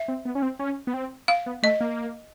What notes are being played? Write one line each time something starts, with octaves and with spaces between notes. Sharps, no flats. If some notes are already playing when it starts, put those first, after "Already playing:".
Already playing: E5
C4
B3
C#4
C4
C#4
B3
C4
F5
B3
A3 D#5
A#3